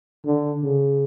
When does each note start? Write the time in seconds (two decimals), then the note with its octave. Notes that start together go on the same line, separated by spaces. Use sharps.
0.25 D3
0.63 C#3